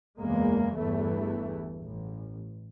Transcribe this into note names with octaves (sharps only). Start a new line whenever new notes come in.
F#1 E2 G#3 A#3
G1 E2 E3 A3
A1